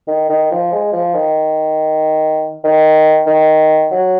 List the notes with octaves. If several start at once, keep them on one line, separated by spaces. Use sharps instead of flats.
D#3
D#3
F3
G#3
F3
D#3
D#3
D#3
F#3